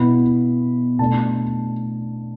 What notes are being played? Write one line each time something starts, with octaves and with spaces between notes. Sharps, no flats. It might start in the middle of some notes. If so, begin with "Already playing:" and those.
Already playing: B2 B3 E4 B5
B2 A3 D4 A5